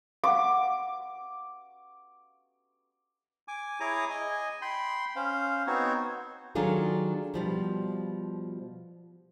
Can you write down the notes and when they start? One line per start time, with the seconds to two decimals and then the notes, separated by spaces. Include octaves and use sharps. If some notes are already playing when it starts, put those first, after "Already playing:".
0.24 F5 F#5 D6
3.48 G#5 D6
3.80 E4 G#4 C#5 A#5 D6 D#6
4.10 D#5 G#5
4.62 G5 B5 C6
5.16 C#4 C5 F5
5.67 B3 C4 D#4 F#4 C5 C#5
6.55 D#3 F#3 D4 F4 G#4 A4
7.34 B2 F3 G3